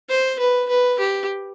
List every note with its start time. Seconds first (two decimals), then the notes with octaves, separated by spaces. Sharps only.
0.10 C5
0.40 B4
0.69 B4
0.99 G4